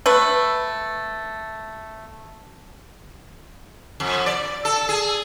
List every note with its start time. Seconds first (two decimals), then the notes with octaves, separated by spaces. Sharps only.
0.06 A3 B4
4.00 F2
4.26 D5
4.65 A4
4.89 G#4